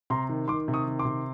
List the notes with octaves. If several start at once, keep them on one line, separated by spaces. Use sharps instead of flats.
C3 A#5 C6
D#3
D#3 C6 D6
C3
C#6 D#6
D#3
C6 D6
C3